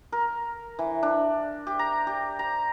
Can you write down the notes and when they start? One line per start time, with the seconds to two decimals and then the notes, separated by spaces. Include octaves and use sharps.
0.12 A#4
0.79 E3
1.03 D4
1.67 G4
1.79 A#5
2.07 G4
2.39 A#5